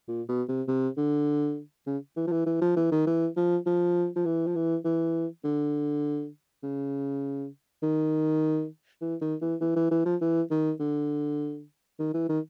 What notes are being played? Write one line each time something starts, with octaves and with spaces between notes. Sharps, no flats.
A#2
B2
C3
C3
D3
C#3
E3
F3
E3
E3
F3
E3
D#3
E3
F3
F3
F3
E3
F3
E3
E3
D3
C#3
D#3
E3
D#3
E3
E3
E3
E3
F3
E3
D#3
D3
D#3
E3
D#3